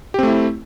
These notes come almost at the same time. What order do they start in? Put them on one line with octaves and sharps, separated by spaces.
G4 C4 A3 E4